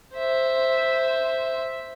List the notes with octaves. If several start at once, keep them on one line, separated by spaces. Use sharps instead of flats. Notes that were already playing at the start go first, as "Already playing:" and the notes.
C5 E5